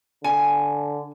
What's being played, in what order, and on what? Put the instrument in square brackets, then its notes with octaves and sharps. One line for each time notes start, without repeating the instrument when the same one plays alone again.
[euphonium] D3 [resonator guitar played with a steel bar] G#5